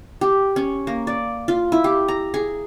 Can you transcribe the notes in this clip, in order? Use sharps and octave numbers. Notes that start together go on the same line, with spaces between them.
G4
C#4
A#3
D5
F4
E4
G4
A#5
G#4